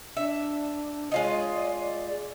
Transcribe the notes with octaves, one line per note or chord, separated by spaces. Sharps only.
D4 E5
G#3 F4 C#5 D#5
D5
D5